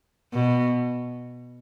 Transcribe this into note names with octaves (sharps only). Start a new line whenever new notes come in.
B2